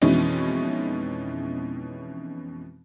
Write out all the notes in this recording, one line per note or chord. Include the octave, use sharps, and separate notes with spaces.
F2 B2 E3 G#3 C#4 D#4